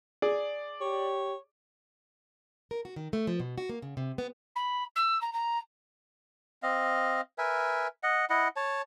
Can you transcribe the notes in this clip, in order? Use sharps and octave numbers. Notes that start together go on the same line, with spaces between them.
G#4 D5
G4 C#5
A#4
F#4
D#3
A3
F3
B2
F#4
A#3
C#3
C3
B3
B5
E6
A#5
A#5
C4 D#5 F5
A#4 B4 E5 G#5
D#5 F#5
E4 D#5 F#5
C#5 A5